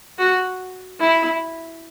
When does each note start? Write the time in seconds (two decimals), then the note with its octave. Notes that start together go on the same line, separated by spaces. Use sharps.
0.18 F#4
1.00 E4